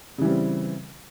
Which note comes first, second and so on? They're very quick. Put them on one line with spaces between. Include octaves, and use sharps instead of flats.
C#3 E3 G3 C4